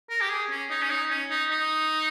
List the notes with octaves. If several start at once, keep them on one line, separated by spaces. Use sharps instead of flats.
A#4
G4
G#4
C#4
D#4
C#4
D#4
C#4
D#4
D#4